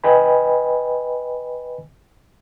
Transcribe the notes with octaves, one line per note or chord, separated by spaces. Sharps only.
B4 D#5 G5 G#5 B5